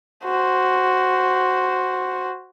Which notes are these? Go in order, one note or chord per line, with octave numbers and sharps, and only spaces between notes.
F#4 C5